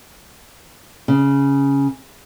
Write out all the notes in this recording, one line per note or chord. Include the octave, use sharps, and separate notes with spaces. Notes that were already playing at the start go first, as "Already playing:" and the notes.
C#3